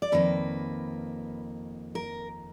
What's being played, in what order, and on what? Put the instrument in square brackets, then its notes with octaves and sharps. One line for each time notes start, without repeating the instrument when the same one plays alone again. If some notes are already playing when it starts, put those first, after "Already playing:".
[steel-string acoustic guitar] D5
F2 D#3 A#3 B4
A#4